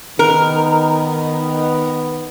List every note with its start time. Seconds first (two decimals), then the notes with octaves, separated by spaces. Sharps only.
0.19 D#3 B3 A#4